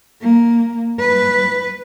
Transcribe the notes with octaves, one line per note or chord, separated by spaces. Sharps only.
A#3
B4